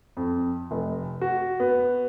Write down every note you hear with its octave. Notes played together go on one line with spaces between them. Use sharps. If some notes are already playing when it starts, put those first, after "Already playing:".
F2
F1
F#4
B3